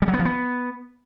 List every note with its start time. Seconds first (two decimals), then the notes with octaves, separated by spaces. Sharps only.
0.02 G3
0.08 F#3
0.14 B3
0.19 F3
0.25 B3